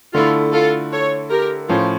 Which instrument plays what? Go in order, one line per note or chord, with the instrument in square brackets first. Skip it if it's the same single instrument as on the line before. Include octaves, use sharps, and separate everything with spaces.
[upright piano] D3 A3 E4 [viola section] F4 A4
[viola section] F4 A4
A4 C#5
G4 A#4
[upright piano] A2 F3 C#4 [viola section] F4